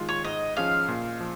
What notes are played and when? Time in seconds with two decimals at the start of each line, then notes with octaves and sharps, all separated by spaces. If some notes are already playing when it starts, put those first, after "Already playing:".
Already playing: D#3 G#3 F4
0.09 C#5
0.24 G#2 D#5
0.57 F3 C#4 G#4 F5
0.88 A#2
1.21 F3